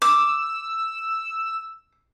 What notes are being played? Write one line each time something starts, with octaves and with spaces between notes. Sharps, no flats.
D6 E6